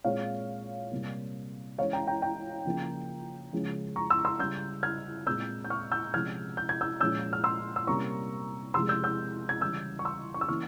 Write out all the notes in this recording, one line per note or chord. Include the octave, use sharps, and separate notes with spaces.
A#2 G#3 C4 C#5 F5
C3 G3 A#3
E3 G#3 C#4 C#5 F5
G5 A#5
G5 A#5
G5 A#5
C#3 F3 A#3 C#4
C#3 F3 G#3 C#4
A#5 C#6
C6 E6
C6 E6
C#3 G3 C#4 E6 G6
F6 G#6
A#2 G#3 C4 E6 G6
G6
C#6 F6
E6 G6
C3 F3 G#3 C#4 F6 G#6
G6
G#6
E6 G6
A#2 F3 G#3 C#4 E6 G6
F6
C6 E6
E6
C3 G3 A#3 C#4 A#5 C#6
C3 F3 G#3 C6 E6
E6 G6
E6 G6
G#6
C#3 E3 G3 C#4 E6 G6
C#6
C6 E6
C#6
E6
E3 A#3 C#4 C#6 F6